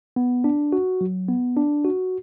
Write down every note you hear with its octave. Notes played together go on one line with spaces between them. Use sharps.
B3
D4
F#4
F#3
B3
D4
F#4